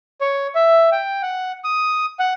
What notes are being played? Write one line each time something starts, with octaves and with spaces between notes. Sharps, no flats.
C#5
E5
G5
F#5
D#6
F#5